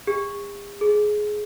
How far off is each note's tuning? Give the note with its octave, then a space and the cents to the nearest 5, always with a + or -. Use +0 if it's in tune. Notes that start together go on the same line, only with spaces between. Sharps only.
G#4 -45
G#4 +15